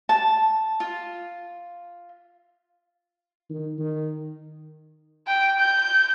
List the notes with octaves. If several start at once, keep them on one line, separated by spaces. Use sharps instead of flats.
A5
F4
D#3
D#3
G5
G6